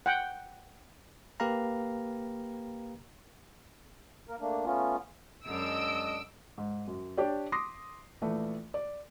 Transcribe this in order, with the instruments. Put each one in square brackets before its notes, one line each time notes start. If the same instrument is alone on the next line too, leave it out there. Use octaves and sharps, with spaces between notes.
[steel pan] F#5 G5
[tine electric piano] A#3 G4 B4 F5 A#5
[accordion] A#3 A#4
A3 A#3 D4
A3 B3 C#4 F4
[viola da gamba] F#2 [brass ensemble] G#3 D4 D#5 [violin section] E6 D7
[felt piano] G#2
F#2
D4 G4 C#5 D5
C6 D6 D#6 A#6 C7
A#1 E3 A3
D5